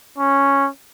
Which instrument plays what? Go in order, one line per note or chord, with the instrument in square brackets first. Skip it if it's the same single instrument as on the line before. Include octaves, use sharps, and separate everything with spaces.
[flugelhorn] C#4